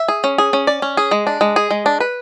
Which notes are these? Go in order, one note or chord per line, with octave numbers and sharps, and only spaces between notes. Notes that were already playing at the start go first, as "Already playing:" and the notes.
Already playing: E5
G#4
C#4
G#4
C#4
D5
C#4
G#4
G#3
D4
G#3
G#4
G#3
D4
B4